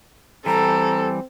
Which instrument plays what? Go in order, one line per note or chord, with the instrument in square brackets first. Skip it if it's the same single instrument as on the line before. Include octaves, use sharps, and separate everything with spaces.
[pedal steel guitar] E3 G3 [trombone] C4 [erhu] A4 [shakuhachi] A#5